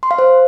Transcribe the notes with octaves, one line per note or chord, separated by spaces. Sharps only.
C6
F5
C5